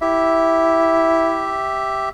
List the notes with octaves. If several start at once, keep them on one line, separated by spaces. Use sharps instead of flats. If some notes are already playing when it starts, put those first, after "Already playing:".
E4 G4 E5